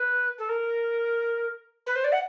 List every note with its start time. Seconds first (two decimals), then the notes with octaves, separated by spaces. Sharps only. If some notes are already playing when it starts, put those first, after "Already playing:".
Already playing: B4
0.38 A4
0.48 A#4
1.86 B4
1.95 C5
2.04 D5
2.12 F#5